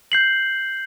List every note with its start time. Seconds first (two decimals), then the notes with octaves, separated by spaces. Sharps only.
0.12 G6 C7 F#7